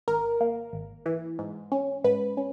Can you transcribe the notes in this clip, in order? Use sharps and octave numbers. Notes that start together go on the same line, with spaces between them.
G#1 A#4
A#3
G#1
E3
G#2
C#4
G#2 B4
C#4